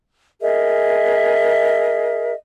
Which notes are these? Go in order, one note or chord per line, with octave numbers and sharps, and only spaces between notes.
G#4 A#4 D#5 E5